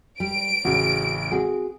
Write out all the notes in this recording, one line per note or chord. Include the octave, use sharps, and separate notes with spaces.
G3 D7
A1 C#3 C4 F#4
C4 F#4 G#4